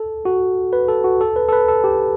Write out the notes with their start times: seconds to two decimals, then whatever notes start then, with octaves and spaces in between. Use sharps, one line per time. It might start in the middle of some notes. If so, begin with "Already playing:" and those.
Already playing: A4
0.25 F#4
0.73 B4
0.88 A4
1.04 F#4
1.21 A4
1.36 B4
1.48 A4
1.53 B4
1.69 A4
1.84 G4